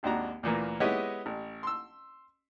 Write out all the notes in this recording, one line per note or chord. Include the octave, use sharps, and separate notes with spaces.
G#1 D#2 D4 F#4 A#5
D2 A#2 E3 A#3
G#3 B3 E4 G4 C#5 D#5
A1
C6 E6